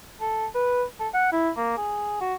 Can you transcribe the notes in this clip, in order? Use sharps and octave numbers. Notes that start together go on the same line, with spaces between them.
A4
B4
A4
F#5
E4
A#3
G#4
F#4